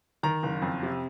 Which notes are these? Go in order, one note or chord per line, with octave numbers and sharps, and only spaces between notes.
D#3 A#5
F#1
F2
C3